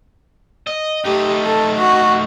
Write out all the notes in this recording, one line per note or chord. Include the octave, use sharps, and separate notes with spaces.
D#5
A3 D#4 G4
A4
F#4